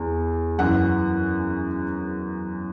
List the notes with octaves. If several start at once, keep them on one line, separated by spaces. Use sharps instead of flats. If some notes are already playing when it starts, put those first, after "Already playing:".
Already playing: E2
F#2 E3 F#5